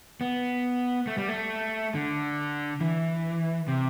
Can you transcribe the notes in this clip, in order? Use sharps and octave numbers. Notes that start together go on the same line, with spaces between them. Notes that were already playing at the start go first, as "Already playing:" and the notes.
B3
A3
G3
A3
D3
E3
C3